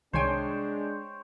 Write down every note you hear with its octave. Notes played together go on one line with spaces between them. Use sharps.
C2 D#3 G#3 D4 C5 C#5 G5 G#5